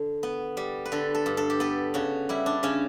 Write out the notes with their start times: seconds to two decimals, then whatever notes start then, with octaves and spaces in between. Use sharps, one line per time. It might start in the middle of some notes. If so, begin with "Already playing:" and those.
Already playing: D3
0.23 B3
0.57 G3
0.85 B4
0.92 D3 A4
1.15 A4
1.26 G2
1.37 A4
1.50 G4
1.60 B3 A4
1.94 C#3 F#4
2.29 G3 E4
2.46 D4
2.63 C#3 C#4